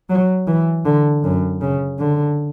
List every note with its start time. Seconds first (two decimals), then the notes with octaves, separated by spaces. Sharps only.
0.10 F#3
0.48 E3
0.85 D3
1.24 F#2
1.61 C#3
1.98 D3